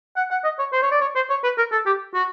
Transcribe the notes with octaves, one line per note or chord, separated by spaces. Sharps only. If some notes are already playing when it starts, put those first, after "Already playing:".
F#5
F#5
D#5
C#5
C5
C#5
D5
C#5
C5
C#5
B4
A#4
A4
G4
F#4